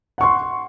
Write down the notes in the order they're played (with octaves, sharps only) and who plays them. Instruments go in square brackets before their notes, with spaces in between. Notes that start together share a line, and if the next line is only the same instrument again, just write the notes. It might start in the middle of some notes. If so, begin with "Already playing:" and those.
[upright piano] F#5
C#6
C6